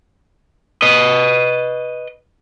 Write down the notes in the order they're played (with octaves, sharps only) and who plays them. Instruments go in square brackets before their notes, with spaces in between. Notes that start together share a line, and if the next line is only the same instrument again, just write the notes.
[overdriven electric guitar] B4 D#5